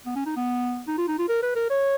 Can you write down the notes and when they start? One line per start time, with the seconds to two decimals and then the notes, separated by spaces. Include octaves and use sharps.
0.06 B3
0.16 C#4
0.26 D#4
0.37 B3
0.88 D#4
0.98 F4
1.08 D#4
1.19 F4
1.29 A#4
1.43 B4
1.56 A#4
1.70 C#5